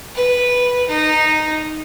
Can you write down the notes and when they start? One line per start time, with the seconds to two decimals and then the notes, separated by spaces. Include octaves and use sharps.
0.15 B4
0.89 D#4